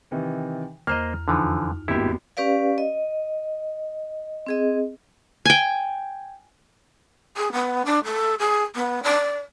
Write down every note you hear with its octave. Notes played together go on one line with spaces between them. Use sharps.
C3 D#3 E3
E2 A#3 C5 D#5 A#5 F6
F2 D3 E3 F3 D#4
G#1 G2 A#3 B3 E4 F#4 G4
C#4 G4 B4 D5 F5
D#5
C4 G#4 D#5
G5 G#5
G#4
B3
D4
A4
G#4
B3
D5